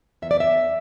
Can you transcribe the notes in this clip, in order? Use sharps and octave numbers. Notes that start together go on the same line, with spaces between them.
E2 E5
D5
E5
E2